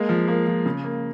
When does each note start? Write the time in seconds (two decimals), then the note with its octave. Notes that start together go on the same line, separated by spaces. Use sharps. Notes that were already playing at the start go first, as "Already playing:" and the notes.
Already playing: G#3 A#3
0.09 F3
0.28 A#3
0.47 F3
0.66 C#3
0.84 A#3